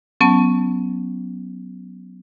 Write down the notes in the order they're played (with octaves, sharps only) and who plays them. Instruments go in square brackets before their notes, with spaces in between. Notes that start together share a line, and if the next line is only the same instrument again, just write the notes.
[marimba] F#3 B3 C#4 A5